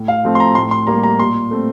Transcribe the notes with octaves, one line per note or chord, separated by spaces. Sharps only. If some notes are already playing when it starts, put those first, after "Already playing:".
Already playing: A2
F5
F3 A3 C4
C6
A#5
A2 C6
C6
G3 A#3 A#5
A#5
A#2 C6
A3 C4